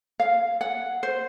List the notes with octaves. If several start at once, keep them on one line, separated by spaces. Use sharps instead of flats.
F5
F#5
C5